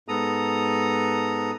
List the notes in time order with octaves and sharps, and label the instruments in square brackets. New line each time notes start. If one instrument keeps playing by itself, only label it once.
[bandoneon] G#2 B3 A4 A#5 D#6